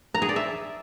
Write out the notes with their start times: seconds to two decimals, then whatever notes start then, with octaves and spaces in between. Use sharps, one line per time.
0.15 A#5
0.22 G#4
0.29 D5
0.36 E5